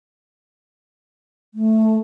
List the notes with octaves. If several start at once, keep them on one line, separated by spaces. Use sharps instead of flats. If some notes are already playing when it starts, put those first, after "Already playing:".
A3